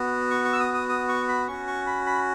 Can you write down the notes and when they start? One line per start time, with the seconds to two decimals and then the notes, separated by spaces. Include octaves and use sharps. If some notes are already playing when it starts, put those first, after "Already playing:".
Already playing: B3 F#4
0.31 C#6
0.45 C#6
0.52 E6
0.60 D#6
0.74 D#6
0.89 D#6
1.08 C#6
1.28 B5
1.48 C#4 F#4 C#6
1.67 C#6
1.87 B5
2.06 B5